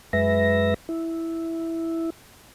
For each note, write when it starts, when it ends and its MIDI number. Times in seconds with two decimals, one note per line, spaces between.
0.13 0.74 42
0.13 0.74 56
0.13 0.74 71
0.13 0.74 76
0.13 0.74 94
0.89 2.10 64